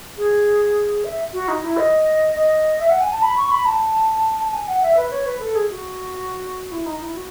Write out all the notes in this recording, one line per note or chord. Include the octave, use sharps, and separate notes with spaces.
G#4
E5
F#4
D#4
E4
D#5
D#5
E5
F#5
G#5
A5
B5
C#6
B5
A5
A5
G#5
F#5
E5
B4
C#5
B4
A4
G#4
F#4
E4
D#4
E4
F#4